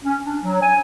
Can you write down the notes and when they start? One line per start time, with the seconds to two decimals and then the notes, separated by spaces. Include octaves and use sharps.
0.05 C#4
0.25 D4
0.44 F#3
0.62 G#5